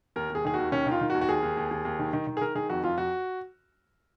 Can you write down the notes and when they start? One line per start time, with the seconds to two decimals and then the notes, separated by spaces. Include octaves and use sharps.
0.16 D#2 A#4
0.30 D#2 G#4
0.45 D#3 G#4
0.54 D#2 F#4
0.72 D#3 C#4
0.87 D#3 F4
1.01 D#3
1.10 F#4
1.15 D#2
1.21 F#4
1.29 D#2 G#4
1.42 D#2
1.57 D#2
1.71 D#2
1.85 D#2
1.99 D#3
2.13 D#3
2.27 D#3
2.37 G#4
2.41 D#3 A#4
2.55 D#3 G#4
2.70 F2 F#4
2.83 F2 F4
2.98 F2 F#4